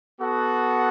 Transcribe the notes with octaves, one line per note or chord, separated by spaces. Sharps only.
B3 F#4 A4 F#5